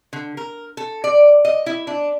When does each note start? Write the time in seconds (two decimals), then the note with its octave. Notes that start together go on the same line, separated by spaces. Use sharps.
0.13 D3
0.37 A#4
0.77 A4
1.04 D5
1.45 D#5
1.66 E4
1.87 D4